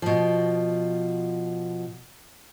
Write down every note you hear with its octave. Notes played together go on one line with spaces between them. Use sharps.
B2 F3